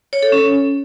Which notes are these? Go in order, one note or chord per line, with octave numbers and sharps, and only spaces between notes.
C#5
A4
C#4